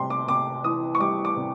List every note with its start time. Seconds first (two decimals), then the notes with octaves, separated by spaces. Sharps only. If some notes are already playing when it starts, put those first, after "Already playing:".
Already playing: C3 G3 C6
0.10 D6
0.27 C3 D6
0.64 E3 D#6
0.95 C#6
1.00 G3 D6
1.25 D6
1.37 C3